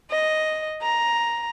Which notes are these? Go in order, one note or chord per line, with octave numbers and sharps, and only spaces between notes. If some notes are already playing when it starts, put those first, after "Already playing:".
D#5
A#5